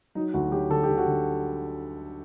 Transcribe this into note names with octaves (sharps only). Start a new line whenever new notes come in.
F#3 D#4
D2 F#4
F#3 G4
D3 A4
G4
D3
F#4
D3